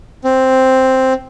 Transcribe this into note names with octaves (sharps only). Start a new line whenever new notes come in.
C4